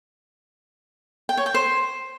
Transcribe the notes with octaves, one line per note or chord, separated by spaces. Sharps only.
G5
C#5
G5
C5